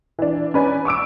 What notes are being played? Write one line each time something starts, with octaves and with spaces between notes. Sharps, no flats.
E3 D4
C#4 B4 D5 G#5
C#6 D6 E6 D7